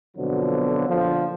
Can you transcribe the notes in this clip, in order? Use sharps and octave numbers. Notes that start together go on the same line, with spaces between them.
F2 B2 D3 F3 F#3
A#1 D3 F3